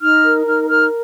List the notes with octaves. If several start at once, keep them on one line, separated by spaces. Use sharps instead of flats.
D#4 F6
A#4
D#4 F6
A#4 F6